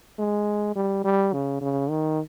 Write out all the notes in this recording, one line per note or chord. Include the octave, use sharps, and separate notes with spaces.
G#3
G3
G3
C#3
C#3
D#3